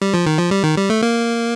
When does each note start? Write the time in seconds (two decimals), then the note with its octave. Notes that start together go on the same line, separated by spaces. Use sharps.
0.02 G3
0.14 F3
0.26 D#3
0.38 F3
0.51 G3
0.63 D#3
0.77 G3
0.90 A3
1.03 A#3